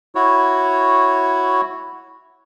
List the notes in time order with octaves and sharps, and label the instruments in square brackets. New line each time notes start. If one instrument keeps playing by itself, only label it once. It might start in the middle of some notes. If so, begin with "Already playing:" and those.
[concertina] E4 F#4 C#5